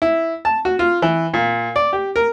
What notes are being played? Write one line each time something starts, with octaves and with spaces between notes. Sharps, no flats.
E4
A5
F#4
F4
E3
A#2
D5
G4
A#4